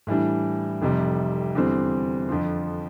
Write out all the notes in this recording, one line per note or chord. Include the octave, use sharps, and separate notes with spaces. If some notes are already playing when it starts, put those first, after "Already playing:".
A2 E3 G3 D4
F1 F2 C3 G3
E2 D3 G3 C4
F2 D3 F3